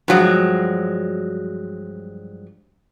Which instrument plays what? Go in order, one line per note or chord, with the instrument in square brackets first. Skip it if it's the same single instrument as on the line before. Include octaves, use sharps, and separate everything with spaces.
[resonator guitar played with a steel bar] G2 F3 F#3 G#3